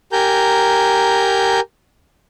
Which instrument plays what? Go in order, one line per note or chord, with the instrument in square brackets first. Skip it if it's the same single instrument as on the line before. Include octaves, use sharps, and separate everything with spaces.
[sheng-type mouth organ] G4 A#4 G#5 A#5 G6